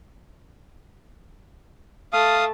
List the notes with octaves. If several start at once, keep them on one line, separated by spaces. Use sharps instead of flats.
A3 F5 A5 D#6